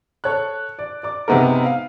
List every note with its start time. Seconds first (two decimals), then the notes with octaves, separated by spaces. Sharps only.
0.24 A4 C#5 A5 F#6
0.79 D5
1.03 D5 D6
1.28 C3 G#3 B3 D#4 A#4
1.66 F5